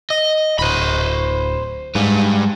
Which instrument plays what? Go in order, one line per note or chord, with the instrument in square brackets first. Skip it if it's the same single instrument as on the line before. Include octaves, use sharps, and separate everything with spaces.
[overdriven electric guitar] D#5
[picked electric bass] D1 [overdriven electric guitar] C5 B5
[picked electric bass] G#2 [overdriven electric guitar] G3 B4